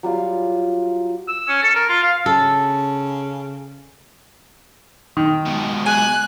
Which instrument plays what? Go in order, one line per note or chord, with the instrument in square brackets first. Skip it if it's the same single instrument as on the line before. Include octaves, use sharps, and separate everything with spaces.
[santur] F#3 G3 F4 F5
[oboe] E6
C#4
A4
A#4
F4
F5
[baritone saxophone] C#3 [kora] A4
[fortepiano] D#3
[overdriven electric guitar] G#2 B2
[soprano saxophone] G#5 [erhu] F#6